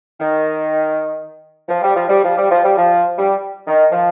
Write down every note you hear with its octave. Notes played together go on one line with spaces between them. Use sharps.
D#3
F3
G3
F3
G3
F3
G3
F3
G3
F3
G3
D#3
F3